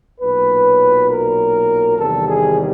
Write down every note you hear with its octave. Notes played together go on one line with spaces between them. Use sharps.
B1 A#2 F#3 B4
A#4
E2 C3 D#3 G3 A4
G#4